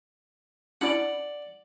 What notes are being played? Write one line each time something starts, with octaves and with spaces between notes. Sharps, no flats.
C#4 D4 E4 D5 F#5